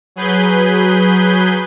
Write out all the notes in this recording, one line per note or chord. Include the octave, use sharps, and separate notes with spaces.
F#3 G#4 B4 G6